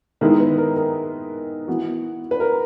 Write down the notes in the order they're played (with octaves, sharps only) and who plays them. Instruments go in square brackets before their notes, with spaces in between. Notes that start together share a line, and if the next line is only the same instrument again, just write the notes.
[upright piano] D#3 G#3 B3 E4 [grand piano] A#4
[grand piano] B4
A#4
A#4
[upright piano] E3 B3 F#4
[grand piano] B4
A#4